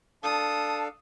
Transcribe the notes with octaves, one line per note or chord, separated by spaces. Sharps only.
D4 A4 F5 A5 D#6